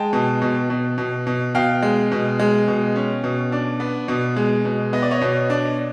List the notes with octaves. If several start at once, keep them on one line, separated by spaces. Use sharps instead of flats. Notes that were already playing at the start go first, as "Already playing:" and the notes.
Already playing: G#3 G5 A5
B2
B2
B2
B2
B2
B2 F5 G5
G#3
B2
G#3
B2
C#4
B2
D4
B3
B2
G#3
B2
B3 D#5
D5
C#5 D#5
B2
D4